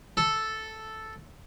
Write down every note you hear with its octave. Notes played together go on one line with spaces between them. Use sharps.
A4